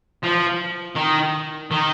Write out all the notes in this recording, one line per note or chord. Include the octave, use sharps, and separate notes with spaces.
F3
D#3
D#3